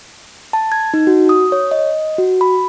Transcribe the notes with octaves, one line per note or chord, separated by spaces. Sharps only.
A5
G#6
D#4
F#4
D#6
C#5
D#5
F#4
B5